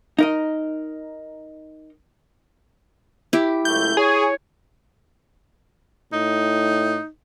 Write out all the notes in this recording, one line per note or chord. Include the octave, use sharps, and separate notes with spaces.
D#4 A#4 D#5
E4 G4
C#2 F#2 A3 G6
G#4 C#5
A2 D#4